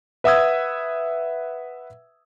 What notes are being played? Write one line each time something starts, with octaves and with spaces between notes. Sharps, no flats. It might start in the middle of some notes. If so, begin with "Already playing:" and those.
B4 E5 F#5 D#6 E6 G#6